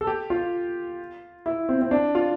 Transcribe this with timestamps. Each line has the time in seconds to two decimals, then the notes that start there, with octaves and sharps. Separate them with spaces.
0.01 A4
0.07 G4
0.30 F4
1.46 E4
1.69 C4
1.82 C4
1.91 D4
2.15 F4